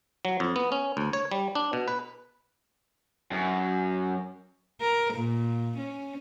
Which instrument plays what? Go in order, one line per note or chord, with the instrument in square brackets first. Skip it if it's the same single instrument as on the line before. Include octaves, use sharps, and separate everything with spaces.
[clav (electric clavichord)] F#3
F2
B3
C#4
D2
C#5
G3
D4
B2
B4
[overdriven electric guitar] F#2
[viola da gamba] A#4
A#2
C#4